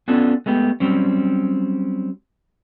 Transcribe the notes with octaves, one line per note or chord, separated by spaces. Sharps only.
B3 C#4 D4 F4 A4
G#3 A3 B3 G4
F#3 G3 C4 C#4